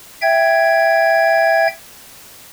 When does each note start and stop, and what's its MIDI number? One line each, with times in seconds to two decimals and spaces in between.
0.22 1.67 76
0.22 1.67 79
0.22 1.67 92